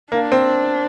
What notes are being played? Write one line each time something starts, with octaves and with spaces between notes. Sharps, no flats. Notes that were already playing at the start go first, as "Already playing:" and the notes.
A#3 D4
C4